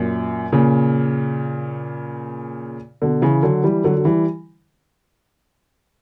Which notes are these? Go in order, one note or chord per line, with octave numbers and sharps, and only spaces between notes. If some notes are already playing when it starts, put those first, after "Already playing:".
Already playing: F#2 A#2
A#2 C#3
B2 D3
C#3 E3
D3 F#3
E3 G3
D3 F#3
F#3
E3 G3